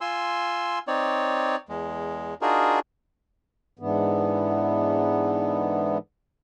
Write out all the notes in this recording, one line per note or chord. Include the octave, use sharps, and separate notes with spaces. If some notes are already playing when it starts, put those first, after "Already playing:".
F4 G#5 C6 E6
C4 D#4 C#5 D5
E2 G#3
D4 D#4 F4 F#4 G#4 A#4
G#2 D3 E3 B3